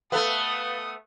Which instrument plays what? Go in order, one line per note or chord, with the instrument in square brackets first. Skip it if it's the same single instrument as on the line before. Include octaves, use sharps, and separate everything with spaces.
[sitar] A3 B3 [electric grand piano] A4 B4 F5 [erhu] D#6